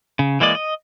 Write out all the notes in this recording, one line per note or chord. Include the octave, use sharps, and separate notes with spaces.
C#3
E3 G#3 A#3 D5 D#5
D#5